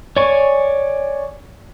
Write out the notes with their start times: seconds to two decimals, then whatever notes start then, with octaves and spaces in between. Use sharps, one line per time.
0.17 C#5 D5 G#5 C#6